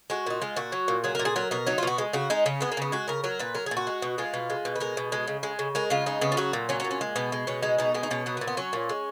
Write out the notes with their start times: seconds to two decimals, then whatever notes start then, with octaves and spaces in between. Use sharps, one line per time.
0.10 G#3 F#4
0.26 A#2 D#4
0.42 G#3 F4
0.56 A#2 F#4
0.72 F#3
0.88 A#2
1.04 F#3 G#4
1.15 A#4
1.19 A#2
1.25 G#4
1.36 F#3 A#4
1.51 B2 A#4
1.67 F#3 D#4
1.78 F4
1.83 B2 F#4
1.98 G#3
2.13 C#3 F#4
2.30 G#3 D#4
2.46 C#3 C#4
2.61 G#3 B3
2.72 A#3
2.77 C#3 B3
2.92 G#3 F#4
3.08 C#3 A#4
3.24 F#3 A#4
3.39 A#2 B4
3.55 F#3 A#4
3.66 G#4
3.71 A#2
3.77 F#4
3.87 G#3
4.02 B2
4.18 G#3 F4
4.34 B2
4.50 G#3
4.65 B2
4.76 B4
4.80 G#3 A#4
4.97 B2
5.12 G#3
5.27 C#3
5.43 G#3
5.59 C#3
5.75 G#3 A#4
5.90 C#3 F4
6.06 G#3 D#4
6.21 C#3 B3
6.32 F4
6.37 F#3 F#4
6.53 A#2
6.69 F#3 C#4
6.80 C#4
6.85 A#2
6.91 C#4
7.01 G#3
7.16 B2 B3
7.32 G#3
7.47 B2 C#4
7.63 G#3 D#4
7.79 B2 D#4
7.94 G#3 B3
8.03 D#4
8.10 B2 C#4
8.26 F#3 B3
8.37 B3
8.41 A#2
8.47 B3
8.57 F#3 C#4
8.73 A#2
8.89 G#3